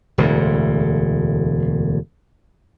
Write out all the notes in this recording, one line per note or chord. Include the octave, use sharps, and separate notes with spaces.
E1 D2 A2